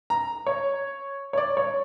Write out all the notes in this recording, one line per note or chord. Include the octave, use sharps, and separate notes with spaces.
A#5
C#5
C#5
D5
C#5